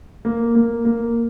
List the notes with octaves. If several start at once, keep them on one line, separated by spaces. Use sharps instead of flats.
A#3
A#3
A#3